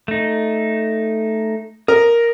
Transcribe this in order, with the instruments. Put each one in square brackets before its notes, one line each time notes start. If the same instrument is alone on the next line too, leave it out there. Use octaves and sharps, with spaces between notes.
[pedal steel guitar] A3 D#4
[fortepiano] A#4 [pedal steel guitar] D#6